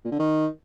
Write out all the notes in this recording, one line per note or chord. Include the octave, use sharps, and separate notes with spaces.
A#2
D3
D#3